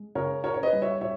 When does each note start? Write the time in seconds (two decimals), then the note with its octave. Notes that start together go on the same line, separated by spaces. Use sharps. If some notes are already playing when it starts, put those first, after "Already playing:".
Already playing: G#3
0.15 C#3 A#4 C#5
0.44 C#4 A#4 C#5
0.54 C#5
0.63 B4 D#5
0.73 G3
0.82 C#5 E5
1.01 C#5 E5